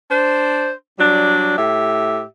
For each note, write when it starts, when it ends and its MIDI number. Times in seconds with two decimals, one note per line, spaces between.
0.10 0.71 62
0.10 0.71 72
0.99 1.54 54
0.99 1.54 55
0.99 1.54 62
1.57 2.22 45
1.57 2.22 67
1.57 2.22 76